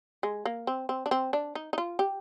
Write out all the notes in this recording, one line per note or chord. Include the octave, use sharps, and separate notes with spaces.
G#3
A#3
C4
C4
D4
C4
D4
D#4
D#4
F4
G4